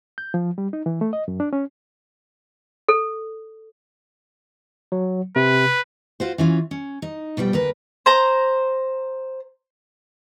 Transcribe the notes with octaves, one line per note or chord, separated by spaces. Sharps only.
G6
F3
G3
D#4
E3
A3
D#5
F#2
D4
C#4
A4
F#3
C3 B4
F4 F#4 C5
E3 C#4 F4
C#4
D#4
B2 F3 G3 G5
D2 A#4 B4
C5 A#5